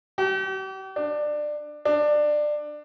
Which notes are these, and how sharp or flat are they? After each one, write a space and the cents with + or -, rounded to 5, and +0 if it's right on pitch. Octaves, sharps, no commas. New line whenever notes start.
G4 -40
D4 +20
D4 +20